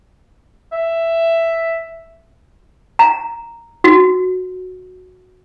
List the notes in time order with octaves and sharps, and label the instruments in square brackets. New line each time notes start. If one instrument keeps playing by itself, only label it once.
[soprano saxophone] E5
[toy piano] A#5
F#4